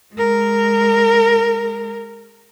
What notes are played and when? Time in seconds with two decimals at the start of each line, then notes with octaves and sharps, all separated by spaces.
0.14 G#3 A#4